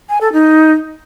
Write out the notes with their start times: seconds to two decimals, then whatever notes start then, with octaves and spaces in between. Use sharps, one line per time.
0.09 G#5
0.21 A4
0.33 D#4